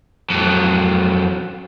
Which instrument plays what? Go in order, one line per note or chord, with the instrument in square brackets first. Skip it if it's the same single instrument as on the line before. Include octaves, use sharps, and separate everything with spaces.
[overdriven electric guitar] F2 F#3